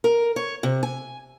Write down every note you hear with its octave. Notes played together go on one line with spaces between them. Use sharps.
A#4
C#5
C3
G#5